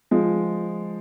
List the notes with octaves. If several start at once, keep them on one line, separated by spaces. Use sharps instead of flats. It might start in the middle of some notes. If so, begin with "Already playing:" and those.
F3 G#3